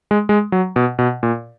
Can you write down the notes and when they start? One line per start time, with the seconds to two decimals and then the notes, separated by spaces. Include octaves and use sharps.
0.11 G#3
0.29 G#3
0.52 F#3
0.76 B2
0.99 B2
1.23 A#2